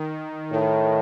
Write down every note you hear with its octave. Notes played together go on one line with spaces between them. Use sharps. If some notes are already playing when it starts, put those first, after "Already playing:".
Already playing: D#3
A2 D#3